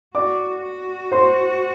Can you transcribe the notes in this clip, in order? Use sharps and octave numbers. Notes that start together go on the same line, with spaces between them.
F#4 D5 D6
F#4
C5 C6